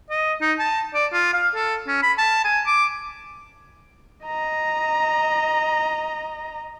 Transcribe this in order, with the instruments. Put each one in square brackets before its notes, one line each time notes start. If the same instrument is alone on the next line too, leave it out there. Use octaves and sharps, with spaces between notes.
[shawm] D#5
D#4
A5
D5
F4
F5
A4
C#4
B5
A5
G#5
D6
[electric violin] D#5 A#5